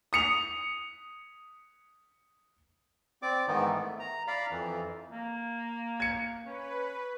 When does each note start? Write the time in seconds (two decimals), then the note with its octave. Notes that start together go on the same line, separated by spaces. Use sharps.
0.13 D#6 C#7 F7
3.22 C4 D5 D6
3.48 G#2 D#3 E3 B3 D#4
3.72 A3
3.99 A#5
4.27 D5 F5 A#5 B5
4.51 F2 E3
5.12 A#3
6.00 G#6 C#7
6.45 C#4 B4